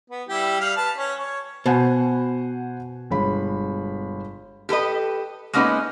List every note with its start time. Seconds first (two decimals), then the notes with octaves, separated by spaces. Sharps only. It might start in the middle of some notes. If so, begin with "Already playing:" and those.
0.10 B3
0.29 G3 E4 G4
0.60 G3 F5
0.76 B4 A5
0.96 C#4
1.19 C#5
1.66 B2 C5 F#5 G#5
3.11 G1 G#3 B5
4.69 G4 A4 B4 D#5
5.53 G#3 A#3 B3 C#4 D#4 B4